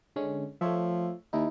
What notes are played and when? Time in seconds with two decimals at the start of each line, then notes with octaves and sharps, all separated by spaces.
0.16 D3 G#3 C#4
0.61 F3 A3 C#5 E5
1.33 D#2 D#4 E4